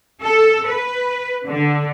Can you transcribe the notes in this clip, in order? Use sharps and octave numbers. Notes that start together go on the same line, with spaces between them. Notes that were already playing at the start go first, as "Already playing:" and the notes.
A4
B4
D3